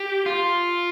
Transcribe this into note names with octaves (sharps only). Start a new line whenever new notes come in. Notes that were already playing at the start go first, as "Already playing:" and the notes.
Already playing: G4
F4